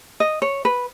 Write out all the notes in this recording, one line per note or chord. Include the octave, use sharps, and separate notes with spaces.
D#5
C#5
B4